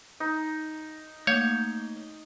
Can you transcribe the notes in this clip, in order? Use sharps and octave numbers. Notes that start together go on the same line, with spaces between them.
D#4
A3 A#3 C#5 G6